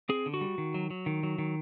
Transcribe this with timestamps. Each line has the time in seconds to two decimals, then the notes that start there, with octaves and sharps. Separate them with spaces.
0.09 C4 G#4
0.26 D3
0.34 F#4
0.41 G3
0.58 D#3
0.74 F#3
0.90 F#3
1.06 D#3
1.23 F#3
1.38 D#3